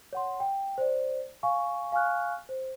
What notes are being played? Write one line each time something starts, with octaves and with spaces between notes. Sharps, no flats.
C#5 F#5 C6
G5
C5 D5
F5 G#5 C#6
F5 G#5 C#6 F6 F#6
C5